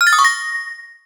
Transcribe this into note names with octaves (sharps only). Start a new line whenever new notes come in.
F6
A6
D#6
C#6
A#6